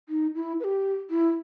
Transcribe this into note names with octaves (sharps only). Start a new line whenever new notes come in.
D#4
E4
B4
G4
E4